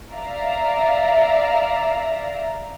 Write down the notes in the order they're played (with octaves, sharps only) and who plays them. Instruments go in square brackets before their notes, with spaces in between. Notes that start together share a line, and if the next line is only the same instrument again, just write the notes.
[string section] D5 E5 F5 A#5